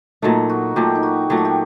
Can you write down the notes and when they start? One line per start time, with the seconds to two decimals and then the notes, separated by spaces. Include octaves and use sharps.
0.22 A#2 F#3 A3 D#4
0.49 F#4
0.76 A#2 F#3 A3 G4
0.95 D#4
1.03 F#4
1.30 A#2 F#3 A3 G4
1.37 F#4
1.45 G4